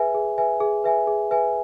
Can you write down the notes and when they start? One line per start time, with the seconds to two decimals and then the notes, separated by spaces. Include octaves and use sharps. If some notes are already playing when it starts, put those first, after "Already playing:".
Already playing: G#4 B4 E5 G#5
0.14 G#4
0.38 B4 E5 G#5
0.60 G#4
0.84 B4 E5 G#5
1.07 G#4
1.31 B4 E5 G#5